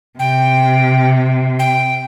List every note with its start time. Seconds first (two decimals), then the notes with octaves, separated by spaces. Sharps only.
0.19 C3 G5
1.59 G5